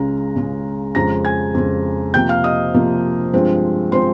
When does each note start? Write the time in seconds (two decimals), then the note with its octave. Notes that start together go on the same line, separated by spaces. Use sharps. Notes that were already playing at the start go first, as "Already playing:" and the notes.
Already playing: C#2 C#3 G#3 A#5
0.36 C#2 C#3 G#3
0.95 F2 C#3 G#3 A#5 A#6
1.25 G#5 G#6
1.54 F2 C#3 G#3
2.14 C3 F3 A#3 G5 G6
2.29 F5 F6
2.44 D#5 D#6
2.74 C3 F3 A#3
3.33 G2 F3 G#3 C4
3.92 F3 G#3 C4 C5 C6